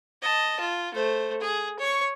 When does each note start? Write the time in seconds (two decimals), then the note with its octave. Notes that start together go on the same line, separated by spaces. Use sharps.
0.22 D#5 A5
0.60 F4
0.94 A3 C5
1.41 G#4
1.79 C#5 C#6